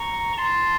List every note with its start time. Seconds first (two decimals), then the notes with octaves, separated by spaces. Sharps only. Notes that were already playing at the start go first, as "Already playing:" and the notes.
Already playing: A#5 C#6
0.37 A5 C6